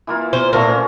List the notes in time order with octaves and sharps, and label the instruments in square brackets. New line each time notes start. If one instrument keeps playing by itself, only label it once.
[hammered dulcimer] E3 A#3 F4
[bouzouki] C5
[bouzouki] A#2 A#4 [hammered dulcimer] A3 F4
[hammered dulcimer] C#4